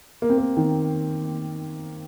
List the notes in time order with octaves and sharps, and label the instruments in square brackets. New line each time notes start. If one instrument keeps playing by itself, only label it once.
[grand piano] A#3
C4
A#3
D#3